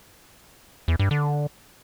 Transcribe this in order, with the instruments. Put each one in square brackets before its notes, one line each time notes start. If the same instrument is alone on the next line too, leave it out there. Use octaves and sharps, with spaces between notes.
[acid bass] E2
G2
D3